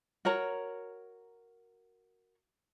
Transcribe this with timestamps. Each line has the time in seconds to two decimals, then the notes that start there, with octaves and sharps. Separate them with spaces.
0.25 F#4 A#4 C#5 A#5